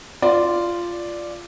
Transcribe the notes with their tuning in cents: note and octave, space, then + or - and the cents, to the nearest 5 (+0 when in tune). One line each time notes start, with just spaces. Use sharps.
F4 -10 D5 +0